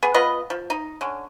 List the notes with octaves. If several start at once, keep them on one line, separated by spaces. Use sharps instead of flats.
B3 G#4
B3 F4 B4 D#5
F3
D#4
D3 C#4